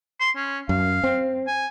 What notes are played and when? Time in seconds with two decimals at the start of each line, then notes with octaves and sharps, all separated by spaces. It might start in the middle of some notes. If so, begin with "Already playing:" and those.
0.20 C6
0.36 C#4
0.69 F#2 F5
1.04 C4
1.47 G#5